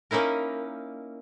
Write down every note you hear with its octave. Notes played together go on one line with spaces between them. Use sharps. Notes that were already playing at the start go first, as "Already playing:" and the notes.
A#3 C#4 D#4 E4 A#4